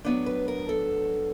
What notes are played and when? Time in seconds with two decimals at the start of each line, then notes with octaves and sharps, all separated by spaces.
0.05 A2 F#3 B3 D4 C#5
0.26 B4
0.48 A#4
0.69 A4